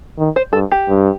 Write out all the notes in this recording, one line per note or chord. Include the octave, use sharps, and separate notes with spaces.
D#3
C5
G2 A4
G4
G2